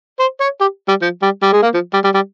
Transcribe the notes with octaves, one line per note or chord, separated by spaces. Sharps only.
C5
C#5
G4
G3
F3
G3
G3
G#3
A#3
F3
G3
G3
G3